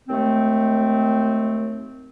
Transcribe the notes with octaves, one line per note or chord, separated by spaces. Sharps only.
D#2 G#3 A3 C4